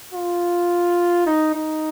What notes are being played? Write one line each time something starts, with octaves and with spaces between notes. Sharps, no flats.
F4
D#4
D#4